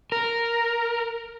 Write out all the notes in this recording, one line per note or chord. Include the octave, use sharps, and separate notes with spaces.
A#4